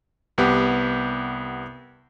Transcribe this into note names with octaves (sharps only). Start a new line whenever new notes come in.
C2 B3 G4